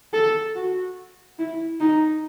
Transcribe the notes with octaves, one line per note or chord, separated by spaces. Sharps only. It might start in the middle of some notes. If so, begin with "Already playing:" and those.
A4
F#4
E4
D#4